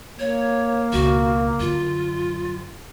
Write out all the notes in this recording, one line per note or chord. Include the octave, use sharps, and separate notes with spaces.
A#3 C#5
C#2 B2 F#4
F#2 D3 F4